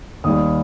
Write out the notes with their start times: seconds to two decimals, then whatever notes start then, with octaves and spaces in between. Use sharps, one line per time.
0.24 D#2 D#3 G3 D#6